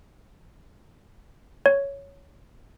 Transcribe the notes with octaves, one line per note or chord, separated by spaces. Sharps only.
C#5